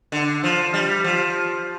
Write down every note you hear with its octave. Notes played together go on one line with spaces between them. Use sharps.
D3
F3
G3
F3